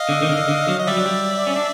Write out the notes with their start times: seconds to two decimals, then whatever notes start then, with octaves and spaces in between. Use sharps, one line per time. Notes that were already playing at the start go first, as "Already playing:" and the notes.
Already playing: D#5 F5
0.09 D3
0.22 D#3
0.29 D3
0.49 D3
0.68 F#3
0.80 D#5
0.87 G3 D5 E5
0.97 F#3
1.06 G3
1.47 C#4
1.56 D4